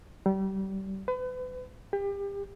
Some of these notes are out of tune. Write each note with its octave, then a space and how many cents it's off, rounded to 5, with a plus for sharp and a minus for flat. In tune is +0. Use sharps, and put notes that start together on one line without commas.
G3 -30
B4 +35
G4 +30